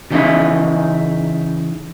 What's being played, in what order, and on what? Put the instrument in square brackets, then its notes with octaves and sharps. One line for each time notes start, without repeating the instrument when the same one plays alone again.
[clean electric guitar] C#3 E3 G3 C#4 D#4 E5